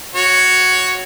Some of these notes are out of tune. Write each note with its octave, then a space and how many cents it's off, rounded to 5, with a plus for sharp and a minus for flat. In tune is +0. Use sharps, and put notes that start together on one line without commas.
F#4 +0 C#5 +5